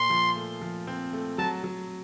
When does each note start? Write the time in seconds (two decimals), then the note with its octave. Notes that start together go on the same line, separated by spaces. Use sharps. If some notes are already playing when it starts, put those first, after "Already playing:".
Already playing: A#2 C6
0.10 F3
0.35 A3
0.61 F3
0.87 C4
1.13 A3
1.38 F#3 A5
1.64 F#3